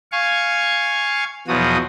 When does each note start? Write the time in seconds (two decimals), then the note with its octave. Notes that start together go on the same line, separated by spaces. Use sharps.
0.12 F5 G#5 C#6
1.48 E2 B2 F3 F#3 F#4 D#6